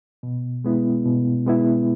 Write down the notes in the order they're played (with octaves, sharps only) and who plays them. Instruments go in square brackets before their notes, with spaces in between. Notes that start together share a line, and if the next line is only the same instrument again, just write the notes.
[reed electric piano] B2
G#3 B3 E4
B2
G#3 B3 E4